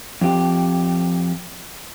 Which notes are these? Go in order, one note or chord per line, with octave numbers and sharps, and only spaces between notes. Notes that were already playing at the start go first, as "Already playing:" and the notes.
F2 G4